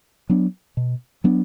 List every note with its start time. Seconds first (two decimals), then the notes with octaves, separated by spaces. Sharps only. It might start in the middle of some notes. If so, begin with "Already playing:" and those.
0.30 F#3 B3 D4
0.77 B2
1.24 F#3 B3 D4